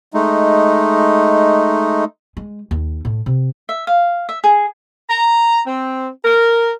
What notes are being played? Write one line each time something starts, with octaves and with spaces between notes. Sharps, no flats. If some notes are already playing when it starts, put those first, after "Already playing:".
G#3 A3 D#4
G#3
D#2
A2
C3
E5
F5
E5
G#4
A#5
C4
A#4